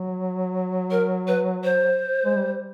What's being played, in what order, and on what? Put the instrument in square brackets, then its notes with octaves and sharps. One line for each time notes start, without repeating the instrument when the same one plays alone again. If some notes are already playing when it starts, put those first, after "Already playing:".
Already playing: [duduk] F#3
[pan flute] A#4
B4
C5
[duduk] G#3
G3